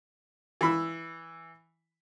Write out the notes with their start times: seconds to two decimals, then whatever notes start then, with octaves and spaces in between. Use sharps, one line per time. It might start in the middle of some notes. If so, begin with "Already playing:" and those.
0.61 E3 B5 E6